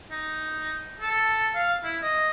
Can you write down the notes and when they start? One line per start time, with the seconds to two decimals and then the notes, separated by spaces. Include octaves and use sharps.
0.11 D#4
1.01 A4
1.55 F5
1.84 E4
2.03 D#5